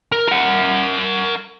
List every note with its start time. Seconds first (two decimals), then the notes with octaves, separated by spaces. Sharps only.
0.12 A#4
0.29 A#4 F#5